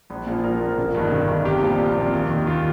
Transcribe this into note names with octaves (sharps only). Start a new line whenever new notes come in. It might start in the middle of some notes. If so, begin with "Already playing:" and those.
A#1
A#2 F3
A#1 A#4
A#2 F3
G1
G2 D#3
G1
G2 D#3
C2 G4
A#2 F3
C2
A#2 F3
D#2
D#3
D#2 F4